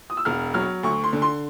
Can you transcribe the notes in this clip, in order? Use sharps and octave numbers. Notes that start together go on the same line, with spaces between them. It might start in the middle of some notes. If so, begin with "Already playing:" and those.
D#6
E6
E1 F6
F#3 F6
D2 C#6
C6
D3
C6